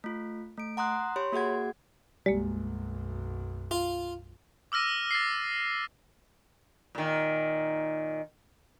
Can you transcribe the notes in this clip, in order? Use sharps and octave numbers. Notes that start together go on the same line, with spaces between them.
A3 F4
A3 D7
F#5 A#5 C6 D#6 F#6
G4 C#5 B5 C6
A#3 F#4 G#4 F#5 G#6
B1 F#2 G3 G#3 A#3
F4
D6 E6 F6 A#6 D#7
A6 A#6 C7
A#2 D#3